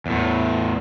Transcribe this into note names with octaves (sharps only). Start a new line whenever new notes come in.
E2 A2